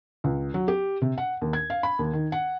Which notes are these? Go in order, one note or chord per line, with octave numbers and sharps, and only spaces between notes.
C#2
F#3
G4
C3
F#5
D#2
G#6
F5
B5
D#2
D#3
F#5